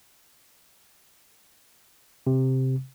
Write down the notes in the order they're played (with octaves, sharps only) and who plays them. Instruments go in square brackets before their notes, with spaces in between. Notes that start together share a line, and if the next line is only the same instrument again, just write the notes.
[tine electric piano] C3